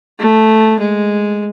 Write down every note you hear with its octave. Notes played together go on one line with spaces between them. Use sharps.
A3
G#3